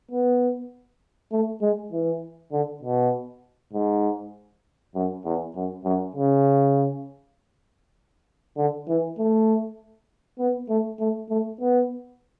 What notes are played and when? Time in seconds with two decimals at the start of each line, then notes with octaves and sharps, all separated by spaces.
0.11 B3
1.32 A3
1.61 G#3
1.92 E3
2.52 D3
2.82 B2
3.73 G#2
4.95 F#2
5.25 E2
5.55 F#2
5.85 F#2
6.16 C#3
8.57 D3
8.88 E3
9.18 A3
10.39 B3
10.69 A3
11.00 A3
11.30 A3
11.60 B3